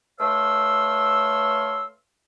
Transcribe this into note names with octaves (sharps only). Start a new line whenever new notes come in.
A3 B4 C#5 F5 C6 E6